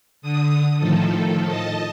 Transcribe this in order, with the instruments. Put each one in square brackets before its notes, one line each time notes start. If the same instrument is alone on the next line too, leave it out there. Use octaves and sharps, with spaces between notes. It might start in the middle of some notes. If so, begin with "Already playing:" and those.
[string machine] D3 D#6
A2 D#3 F3 A4
D#5 A5